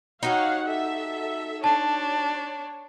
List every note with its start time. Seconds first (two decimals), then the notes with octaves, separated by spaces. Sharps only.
0.23 D#4 F#4 G4 C#5 F5 F#5
0.65 A4 E5
1.64 D4 C#5 A5